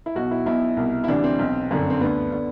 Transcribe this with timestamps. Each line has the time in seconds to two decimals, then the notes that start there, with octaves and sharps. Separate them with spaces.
0.06 E4
0.15 B1 B2 F#4
0.31 E4
0.46 B1 B2 E4
0.77 C2 B2
1.04 E4
1.08 D2 C3 E3 D4
1.24 C4
1.39 B1 B2
1.70 G1 F#2 D3
1.90 C4
2.01 D2 D3 B3
2.32 D3